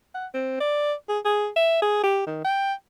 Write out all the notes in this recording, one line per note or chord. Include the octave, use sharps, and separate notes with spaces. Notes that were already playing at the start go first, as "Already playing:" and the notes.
F#5
C4
D5
G#4
G#4
E5
G#4
G4
D#3
G5